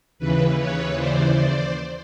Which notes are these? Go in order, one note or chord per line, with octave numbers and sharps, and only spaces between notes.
D#2 C#3 E3 B4
B4 C#5
C5 D5
C5 D5